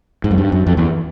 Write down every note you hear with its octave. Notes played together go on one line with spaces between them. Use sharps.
G#2
F#2
G2
F#2
F2
E2